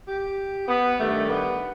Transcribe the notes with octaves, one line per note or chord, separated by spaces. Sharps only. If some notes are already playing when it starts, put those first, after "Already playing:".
G4
B3
G2 D#3 G3 A3
B3